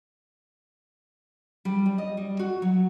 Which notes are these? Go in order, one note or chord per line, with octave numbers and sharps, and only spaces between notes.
G3
G3
D#5
G3
F#4
F#3